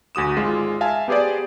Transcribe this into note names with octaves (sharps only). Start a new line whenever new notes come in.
D2 F#4 D#6 E7
G#1 G#3 F4
E5 F5 G#5 A5
B3 G4 G#4 C5 D5